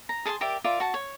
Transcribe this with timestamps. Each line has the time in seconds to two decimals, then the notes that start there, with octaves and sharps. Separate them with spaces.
0.09 A#5
0.25 G#4 A5 B5 C6
0.41 G4 A#4 D5 E5
0.64 F4 A#4 D5 E5
0.80 F#4 A5
0.94 C#5